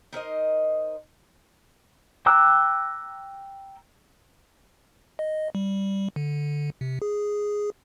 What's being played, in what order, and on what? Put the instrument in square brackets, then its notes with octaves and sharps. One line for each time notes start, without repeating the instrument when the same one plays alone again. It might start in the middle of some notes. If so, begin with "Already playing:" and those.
[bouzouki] D#4 A#4 C5 D#5
[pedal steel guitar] G5 A#5 D6 E6 F#6
[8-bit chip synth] D#5
G3
D3
C3
G#4